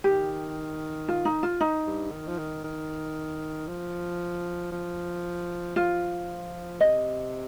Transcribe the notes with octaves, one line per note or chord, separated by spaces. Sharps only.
D#3 G4
F4
D#4
F4
D#4
G2
D#3
F3
D#3
D#3
F3
F3
F3 F4
C3 D#5